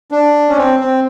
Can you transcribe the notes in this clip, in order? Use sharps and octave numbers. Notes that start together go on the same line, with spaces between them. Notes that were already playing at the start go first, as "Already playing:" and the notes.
D4
C#4
C4
C4